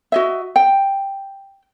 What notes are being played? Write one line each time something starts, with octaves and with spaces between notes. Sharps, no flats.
F#4 D#5 E5
G5